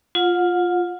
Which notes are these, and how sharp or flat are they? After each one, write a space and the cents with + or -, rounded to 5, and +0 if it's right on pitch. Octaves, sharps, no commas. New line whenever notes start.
F4 +0 F#5 -35